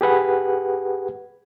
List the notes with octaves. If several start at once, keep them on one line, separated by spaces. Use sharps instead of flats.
G4 G#4 B4 F#5